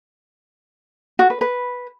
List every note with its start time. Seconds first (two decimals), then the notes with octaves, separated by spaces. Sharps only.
1.19 F#4
1.30 B4
1.41 B4